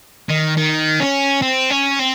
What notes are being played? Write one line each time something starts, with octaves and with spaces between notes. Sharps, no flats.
D#3
D#3
C#4
C4
C#4
C4